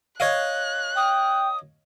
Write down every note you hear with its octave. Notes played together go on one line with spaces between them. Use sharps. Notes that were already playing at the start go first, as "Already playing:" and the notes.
C#5 D#5 F5 F#6
G5 D#6